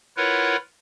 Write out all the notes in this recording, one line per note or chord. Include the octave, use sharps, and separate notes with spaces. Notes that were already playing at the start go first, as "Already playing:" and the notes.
E4 F4 A#4 B4 C#5 F#5